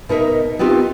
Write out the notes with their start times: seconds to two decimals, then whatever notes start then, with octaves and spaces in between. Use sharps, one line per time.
0.09 B2 D#4 A#4 E5
0.59 B3 C4 D#4 F4 G4